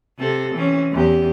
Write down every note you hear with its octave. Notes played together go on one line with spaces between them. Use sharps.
C3 C4 A4
E3 C4 C#4
E2 G4